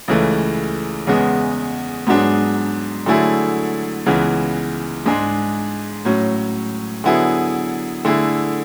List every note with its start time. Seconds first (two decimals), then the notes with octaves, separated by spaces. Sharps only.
0.08 C#2 C#3 E3 A3
1.07 E2 C#3 G#3 B3
2.07 G#2 F#3 B3 D4 G#4
3.06 D3 F#3 A3 E4 G#4
4.06 C#2 C#3 E3 B3
5.05 G#2 G#3 D4 G#4
6.05 A2 F#3 C#4
7.04 D3 F#3 B3 E4 G#4
8.05 D3 A3 E4 G#4